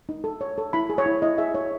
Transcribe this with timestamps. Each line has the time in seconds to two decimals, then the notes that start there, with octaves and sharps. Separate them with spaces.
0.09 D#4
0.24 A4
0.41 C#5
0.58 A4
0.73 E4 B5
0.90 G#4
0.98 C#5
1.06 E4
1.22 E4 D#5
1.38 G#4 E5
1.54 E4 C#5